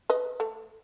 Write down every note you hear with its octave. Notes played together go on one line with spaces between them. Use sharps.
B4 D#5
A3